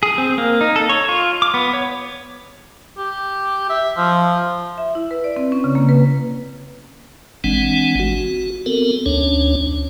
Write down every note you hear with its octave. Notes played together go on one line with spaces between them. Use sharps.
G#4
C4
A#3
D#4
A4
C#5
F4
D6
B3
C#5
G4
E5
F3
E5
E4
B4
D5
C4
C#4
C#3
A#3
B4
G#1 E3 G#3 C4 D4 F#5
F#4
B3 C4 A4 A#4
D2 C#4 D4 C#5